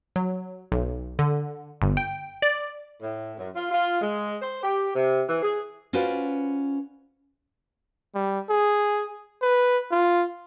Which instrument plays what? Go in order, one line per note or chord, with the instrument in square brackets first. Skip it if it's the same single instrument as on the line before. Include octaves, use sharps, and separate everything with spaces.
[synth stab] F#3
B1
D3
G1
G5
D5
[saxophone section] A2
F#2
F4
F4
G#3
C5
G4
C3
E3
G#4
[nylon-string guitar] C#4 F4 F#4 B4 C5 D5
[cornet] G3
G#4
B4
F4